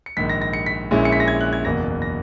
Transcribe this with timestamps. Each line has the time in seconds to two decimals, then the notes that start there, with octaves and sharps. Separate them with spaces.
0.06 C#7
0.17 A#1 G#2 D#3 B6
0.29 A#6
0.42 A#6
0.53 C#7
0.66 B6
0.91 A#1 A#2 G#3 C#4 E4
1.05 C#7
1.12 B6
1.20 A#6
1.28 G#6
1.41 F#6
1.53 G#6
1.65 F#1 E2 B2 A#3 A#6
2.02 A#6